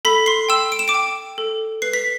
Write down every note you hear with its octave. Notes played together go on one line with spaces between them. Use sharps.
A4 B5 B6
C6 C7
G5 E6 E7
D7
E7
D6 D7
G5
A4
B4 C7
B6